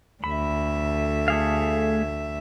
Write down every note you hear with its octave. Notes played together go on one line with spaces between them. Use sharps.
D2 E5 B5
A3 G#4 F5